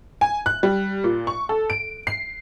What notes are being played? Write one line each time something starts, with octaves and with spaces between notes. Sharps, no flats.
G#5
F#6
G3
A#2
C#6
A4
D7
C7